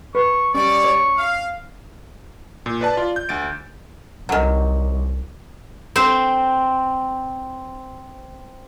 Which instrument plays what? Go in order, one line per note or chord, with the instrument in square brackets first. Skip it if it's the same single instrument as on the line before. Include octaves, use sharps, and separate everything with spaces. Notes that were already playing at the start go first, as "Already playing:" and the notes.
[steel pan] B4 [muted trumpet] C#6
[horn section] G3 D5 [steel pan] C#4 [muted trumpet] C#6
[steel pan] C#5
[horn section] F5
[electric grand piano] A#2
B4 D5 A5
F4 D5
G6
D2 A6 D7
[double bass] C2 [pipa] D#3 F#3
[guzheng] C4 C5